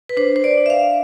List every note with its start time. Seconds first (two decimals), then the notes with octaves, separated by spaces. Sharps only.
0.09 B4
0.17 D4 C5
0.36 C5
0.44 D5
0.57 D4
0.66 E5
0.70 F5